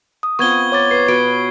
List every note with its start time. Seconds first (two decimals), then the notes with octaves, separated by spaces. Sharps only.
0.23 D#6
0.39 B3 C4 F4 C#6 G#6 G7
0.72 C#5 D6 A6
0.91 B4 C7
1.08 B2 B4 C#5 D7